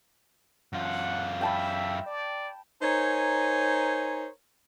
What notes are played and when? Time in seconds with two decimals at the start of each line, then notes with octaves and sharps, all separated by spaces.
0.73 F#2 F4 F#5
1.41 E5 G5 A5 B5
2.06 D5
2.82 D#4 A#4 C5 C#5 G#5